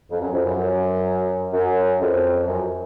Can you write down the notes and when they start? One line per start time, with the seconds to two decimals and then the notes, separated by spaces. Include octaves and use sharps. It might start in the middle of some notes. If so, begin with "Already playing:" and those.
0.10 F2
0.21 F#2
0.34 F2
0.46 F#2
1.53 F#2
2.00 F2
2.47 F#2